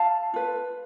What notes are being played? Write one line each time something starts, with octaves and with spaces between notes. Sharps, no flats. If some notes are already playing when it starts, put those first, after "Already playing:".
Already playing: E4 F5 A5
F4 B4